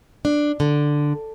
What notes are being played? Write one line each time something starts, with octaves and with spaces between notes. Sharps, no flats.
D4
D3